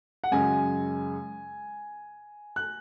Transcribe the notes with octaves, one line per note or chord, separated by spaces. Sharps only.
F#5
F#2 C#3 G#3 G#5
F#6